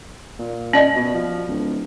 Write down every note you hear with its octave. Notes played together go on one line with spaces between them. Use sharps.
A#2
C#4 D5 D#5
B2
F3
D1